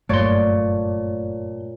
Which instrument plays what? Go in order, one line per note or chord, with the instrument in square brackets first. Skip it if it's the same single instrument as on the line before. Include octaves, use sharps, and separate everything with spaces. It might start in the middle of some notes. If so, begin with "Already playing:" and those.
[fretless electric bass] F#1 G2 [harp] A#2 C#5 D5 [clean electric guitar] A3 C6